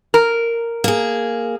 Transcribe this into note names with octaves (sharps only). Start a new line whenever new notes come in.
A#4
A#3 G#4